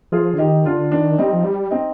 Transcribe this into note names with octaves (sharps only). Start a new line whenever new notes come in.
F3 F4 G#4
D3
D#3 D#4 G4
D3 D4 F4
D#3 D4
G3 C4 D#4
F3
G3
C4 D#4